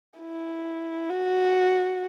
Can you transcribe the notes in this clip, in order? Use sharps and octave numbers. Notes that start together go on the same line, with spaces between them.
E4
F#4